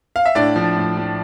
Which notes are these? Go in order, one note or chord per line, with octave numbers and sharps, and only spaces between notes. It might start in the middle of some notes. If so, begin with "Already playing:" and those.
F5
E5
A2 D4 D5
F3
A2
F3